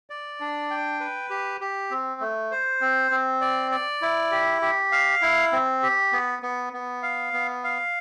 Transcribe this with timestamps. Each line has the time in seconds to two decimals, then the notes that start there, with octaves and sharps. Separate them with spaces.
0.10 D5
0.40 D4
0.70 G5
1.00 B4
1.30 G4
1.61 G4
1.91 C4
2.21 A3
2.51 C5
2.81 C4
3.11 C4
3.41 D5
3.72 D5
4.02 E4
4.31 G4
4.62 G4
4.92 F5
5.22 E4
5.52 C4
5.83 G4
6.13 B3
6.43 B3
6.73 B3
7.03 F5
7.34 B3
7.64 F5